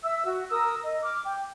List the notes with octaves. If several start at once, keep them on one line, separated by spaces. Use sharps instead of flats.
E5 E6
F#4
A#4 D#6 E6
D#5
D6 F6
G5